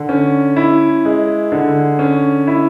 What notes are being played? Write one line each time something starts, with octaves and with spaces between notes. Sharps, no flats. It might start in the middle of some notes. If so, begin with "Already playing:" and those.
Already playing: D3
C#4
E4
G#3
D3
C#4
E4